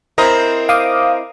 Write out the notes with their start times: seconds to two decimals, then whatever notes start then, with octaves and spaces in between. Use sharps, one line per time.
0.18 C4 E4 A#4 C5 D#5 A#5
0.69 F5 D6 D#6